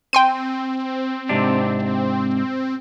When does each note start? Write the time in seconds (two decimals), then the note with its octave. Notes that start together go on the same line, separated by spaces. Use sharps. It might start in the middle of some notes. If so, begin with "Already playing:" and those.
0.13 C4 G5 C6 D#7
1.29 G#2 C3 D4